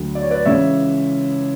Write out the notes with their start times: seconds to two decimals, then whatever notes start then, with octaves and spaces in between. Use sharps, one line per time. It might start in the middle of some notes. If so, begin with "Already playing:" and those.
Already playing: D2 D3 F#3
0.15 D5
0.23 C#5
0.31 B4 D5
0.45 C#2 C#3 E3 C#5 E5